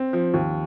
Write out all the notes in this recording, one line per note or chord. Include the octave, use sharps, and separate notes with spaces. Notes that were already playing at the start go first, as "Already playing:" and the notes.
Already playing: C4
F3
D#2